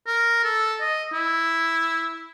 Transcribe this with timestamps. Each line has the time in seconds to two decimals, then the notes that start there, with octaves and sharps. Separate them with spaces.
0.07 A#4
0.44 A4
0.81 D#5
1.13 E4